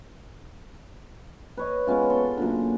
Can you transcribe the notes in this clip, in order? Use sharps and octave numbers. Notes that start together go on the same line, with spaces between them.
B4 C#5 D#5
G#3 B3 C#4 F4
A4 C6
F#2 A#2 D3